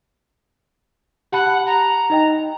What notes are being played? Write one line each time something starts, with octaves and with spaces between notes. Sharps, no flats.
G4 F#5 A5 B5
A#5
D#4 D#5 G5